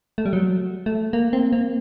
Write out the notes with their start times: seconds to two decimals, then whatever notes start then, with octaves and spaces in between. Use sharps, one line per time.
0.18 A3
0.26 G3
0.33 F#3
0.86 A3
1.13 A#3
1.33 C4
1.52 A#3